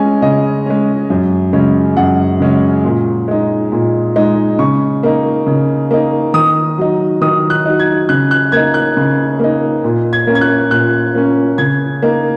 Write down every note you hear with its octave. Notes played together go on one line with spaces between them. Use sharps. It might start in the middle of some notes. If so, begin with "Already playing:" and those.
Already playing: G#3 C#4 G#5
C#3 D#5
G#3 C#4
F#2
C#3 G#3 C#4
F#2 F#5
C#3 G#3 C#4
A#2
G#3 D#4
A#2
G#3 D#4
C#3 C#6
A#3 D#4
C#3
A#3 D#4
D#3 D#6
F#3 D#4
D#3 D#6
F#6
F#3 D#4
G#6
C#3 F#6
F#6
A#3 D#4 G#6
F#6
C#3
A#3 D#4
A#2
G#6
A#3 C#4
G#6
F#6
A#2 F#6
A#3 C#4
C#3 G#6
A#3 D#4